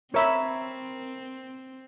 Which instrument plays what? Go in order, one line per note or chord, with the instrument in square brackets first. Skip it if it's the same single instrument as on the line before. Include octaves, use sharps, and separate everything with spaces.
[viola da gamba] C4 [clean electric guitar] A#4 A#5 [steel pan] C#5 E5 B5